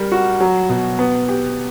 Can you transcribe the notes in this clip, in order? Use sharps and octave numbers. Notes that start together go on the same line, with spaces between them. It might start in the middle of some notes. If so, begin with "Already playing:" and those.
Already playing: G3 A#4
F#4
F#3
B2
B3
G4